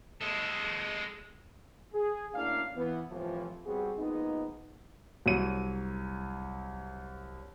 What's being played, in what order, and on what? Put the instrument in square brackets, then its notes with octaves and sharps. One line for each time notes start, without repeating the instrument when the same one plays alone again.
[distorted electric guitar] G#3 A4
[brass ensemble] G#4
D2 A#3 C#4 D4 E4 F5
E3 B3
C2 A2 C3 E3 F3
G3 B3 C4 F#4 G#4
F3 G#3 A#3 B3 D#4
[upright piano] C2 F#3 C#5 D#7